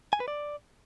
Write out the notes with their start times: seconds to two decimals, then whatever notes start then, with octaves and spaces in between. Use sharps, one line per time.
0.13 G#5
0.20 B4
0.28 D5